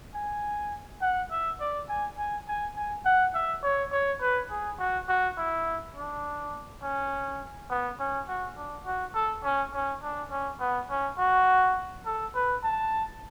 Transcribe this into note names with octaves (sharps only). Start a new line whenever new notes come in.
G#5
F#5
E5
D5
G#5
G#5
G#5
G#5
F#5
E5
C#5
C#5
B4
G#4
F#4
F#4
E4
D4
C#4
B3
C#4
F#4
D4
F#4
A4
C#4
C#4
D4
C#4
B3
C#4
F#4
A4
B4
A5